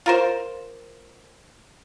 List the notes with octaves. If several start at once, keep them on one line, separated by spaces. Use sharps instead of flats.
F4 A#4 C5